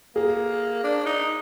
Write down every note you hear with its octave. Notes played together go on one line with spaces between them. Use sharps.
A#3 G#4
D4
D#4